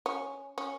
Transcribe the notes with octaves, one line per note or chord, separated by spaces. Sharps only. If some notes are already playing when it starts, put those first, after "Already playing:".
C#4
C#4